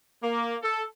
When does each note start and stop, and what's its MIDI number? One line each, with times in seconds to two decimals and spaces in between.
0.22 0.56 58
0.62 0.82 69